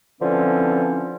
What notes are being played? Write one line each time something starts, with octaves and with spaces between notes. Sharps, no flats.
D3 E3 F3 C4 C#4